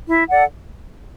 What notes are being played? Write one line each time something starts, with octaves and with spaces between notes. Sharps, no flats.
E4
A4 D5 F#5